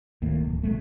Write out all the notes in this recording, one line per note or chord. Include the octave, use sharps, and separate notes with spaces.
D1 D#2 A2 A#3
D1
B1 G#3 A3